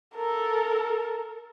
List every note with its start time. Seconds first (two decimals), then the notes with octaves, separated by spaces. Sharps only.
0.15 A4 A#4